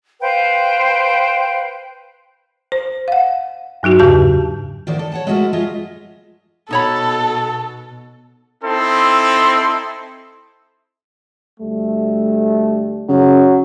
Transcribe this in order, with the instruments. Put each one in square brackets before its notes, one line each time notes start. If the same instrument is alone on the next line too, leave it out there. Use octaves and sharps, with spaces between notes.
[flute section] B4 C5 F5 G5
[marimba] C5
F5 F#5
G2 F#3 D#4 F#4
E2 G#2 C#3 G4 A5 G6
[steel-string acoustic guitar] A2 D3 D#3 C5 D5
A4
C#5 F#5 A5
G#3 A3 E4 F#4 A4 A#4
G#3 F4 D#5 E5
[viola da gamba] B2 [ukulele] D#4 C#5 B5 [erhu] A4
[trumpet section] C4 D#4 E4 A4 C6
[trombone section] D2 G3 A3
[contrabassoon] C#3 [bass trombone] F#3